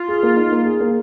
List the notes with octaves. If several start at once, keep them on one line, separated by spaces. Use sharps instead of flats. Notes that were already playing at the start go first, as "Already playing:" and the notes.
Already playing: F4
G#4
A#3
D#4
A#3
G#4
A#3